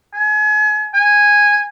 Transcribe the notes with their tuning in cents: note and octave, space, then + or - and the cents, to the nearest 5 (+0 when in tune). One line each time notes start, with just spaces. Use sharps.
G#5 +35
G#5 -10